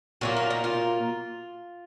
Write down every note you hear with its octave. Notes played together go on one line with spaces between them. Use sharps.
A#2 F#3 A#3 F#4
F4
D#4
F4